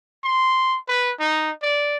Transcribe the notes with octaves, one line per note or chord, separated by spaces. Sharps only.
C6
B4
D#4
D5